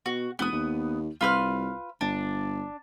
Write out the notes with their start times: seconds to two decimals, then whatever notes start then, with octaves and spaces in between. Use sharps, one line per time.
0.06 B2 F#4
0.39 F1 B3 D#6
0.52 D#2
1.21 C2 F4 B4 F6
2.01 G1 D4